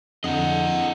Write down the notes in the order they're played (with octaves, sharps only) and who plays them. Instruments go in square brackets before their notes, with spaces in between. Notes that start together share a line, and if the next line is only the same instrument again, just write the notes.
[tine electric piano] F2 [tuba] D3 [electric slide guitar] E4 D#5 [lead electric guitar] G#4 F#5